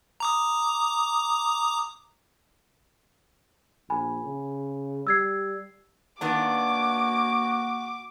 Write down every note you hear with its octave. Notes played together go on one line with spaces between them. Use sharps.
A#5 D6 D#6
A#1 G#5 B5
C#3
G3 E6 G#6 C7
D#3 A#3 B3 D4 F#4 D6